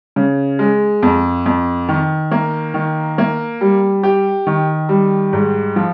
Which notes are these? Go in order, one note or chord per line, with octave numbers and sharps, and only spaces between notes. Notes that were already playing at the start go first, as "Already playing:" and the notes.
C#3
G#3
F2
F2
D#3
A#3
D#3
A#3
G3
G4
D#3
G3
G#2
F3